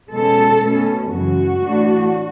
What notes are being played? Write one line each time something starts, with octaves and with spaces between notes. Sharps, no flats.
B2 G#3 C#4 A4
B2 A3 C#4
F#2 C#3 E3 G#3 F#4
A2 E3 A3 D4